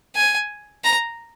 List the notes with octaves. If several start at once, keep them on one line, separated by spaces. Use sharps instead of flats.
G#5
A#5